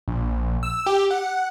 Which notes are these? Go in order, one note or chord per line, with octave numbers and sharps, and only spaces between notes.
A#1
E6
G4
F#5